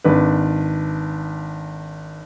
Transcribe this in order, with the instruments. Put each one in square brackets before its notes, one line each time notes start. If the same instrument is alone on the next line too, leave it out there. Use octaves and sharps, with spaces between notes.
[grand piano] G#1 D4 B4